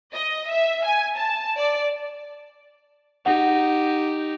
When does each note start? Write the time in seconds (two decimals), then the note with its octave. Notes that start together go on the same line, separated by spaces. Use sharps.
0.12 D#5
0.49 E5
0.85 G#5
1.16 A5
1.57 D5
3.26 D#4 G4 F#5